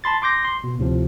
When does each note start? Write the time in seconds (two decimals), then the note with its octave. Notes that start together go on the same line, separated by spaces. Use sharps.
0.04 A5 B5 C6 A6
0.22 C6 D6 G6 A#6
0.45 C6
0.64 B2
0.79 D2 A2 C3 F3